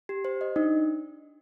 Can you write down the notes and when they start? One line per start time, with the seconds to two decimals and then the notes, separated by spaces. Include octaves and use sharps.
0.09 G4
0.25 C5
0.41 D#5
0.56 D4 D#4